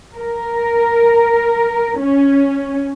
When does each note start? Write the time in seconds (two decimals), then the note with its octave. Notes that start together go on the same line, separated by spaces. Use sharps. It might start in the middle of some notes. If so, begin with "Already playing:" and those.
0.15 A#4
2.00 C#4